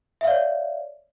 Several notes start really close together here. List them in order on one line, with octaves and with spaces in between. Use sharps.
E5 F5 D5 C#5